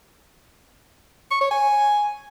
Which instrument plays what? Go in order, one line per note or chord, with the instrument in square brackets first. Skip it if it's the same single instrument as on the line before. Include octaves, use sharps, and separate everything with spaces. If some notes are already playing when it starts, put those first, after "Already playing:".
[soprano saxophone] C#6
C#5
G#5